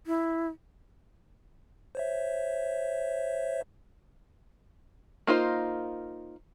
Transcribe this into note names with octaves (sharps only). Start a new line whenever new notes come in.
E4
C5 C#5 E5
A#3 D#4 F4 C5